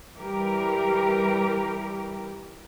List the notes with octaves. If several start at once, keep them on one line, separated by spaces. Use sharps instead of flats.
E3 G3 G4 A#4